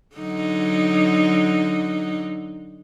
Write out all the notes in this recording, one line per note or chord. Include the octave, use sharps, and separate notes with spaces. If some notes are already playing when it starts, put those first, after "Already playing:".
D3 F#3 D#4